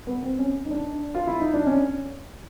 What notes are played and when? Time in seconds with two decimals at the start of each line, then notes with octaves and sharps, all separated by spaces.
0.07 B3
0.22 C4
0.39 C#4
0.65 D#4
0.71 D4
1.15 F4
1.27 E4
1.40 D#4
1.54 D4
1.67 C#4